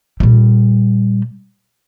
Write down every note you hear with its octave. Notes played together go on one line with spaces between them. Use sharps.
A#2 G3